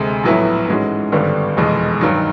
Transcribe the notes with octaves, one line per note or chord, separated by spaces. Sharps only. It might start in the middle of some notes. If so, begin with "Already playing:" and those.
Already playing: D2 C3 G#3
A#1 A2 F#3 B3 E4
G#2 E3 G#3 C#4 F#4
G#1 G2 D3 G3 B3
F1 E2 B2 G#3
G2 D#3 F#3